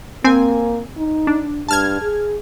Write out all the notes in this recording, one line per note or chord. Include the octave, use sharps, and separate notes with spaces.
A#3 C4 G#5
D#4
D4
G2 A5 F6 G#6
G#4